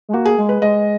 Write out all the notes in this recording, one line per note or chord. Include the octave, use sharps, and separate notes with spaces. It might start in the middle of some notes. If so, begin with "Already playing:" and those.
G#3
A#3 F#4
G#4
G#3
B4
G#3 D#5